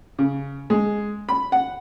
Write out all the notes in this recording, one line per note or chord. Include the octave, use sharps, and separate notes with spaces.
C#3
G#3
B5
F#5